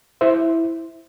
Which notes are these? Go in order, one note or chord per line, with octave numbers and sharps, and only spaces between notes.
E4 C5 E5